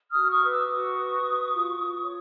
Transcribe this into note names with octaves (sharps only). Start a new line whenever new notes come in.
D#6 F6
F#4
C#6 D#6
B4
D6 E6
E6
F#4 C#6 D#6
B4
F#4
F4
F4
C#5